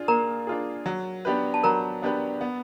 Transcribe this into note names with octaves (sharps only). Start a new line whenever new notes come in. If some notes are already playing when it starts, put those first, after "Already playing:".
Already playing: D4 F4 G#4
A#3 A#4 A#5
D4 F4 G#4
F#3
B3 D4 G4 B4
A5
F#3 A#4 A#5
B3 D4 G4 B4
B3